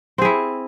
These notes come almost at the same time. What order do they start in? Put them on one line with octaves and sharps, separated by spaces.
C4 G#4 E4